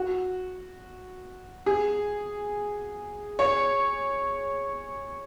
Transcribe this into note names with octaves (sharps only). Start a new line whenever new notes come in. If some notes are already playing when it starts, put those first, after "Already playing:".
Already playing: F#4
G#4
C#5